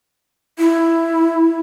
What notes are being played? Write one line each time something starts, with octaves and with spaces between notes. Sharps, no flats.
E4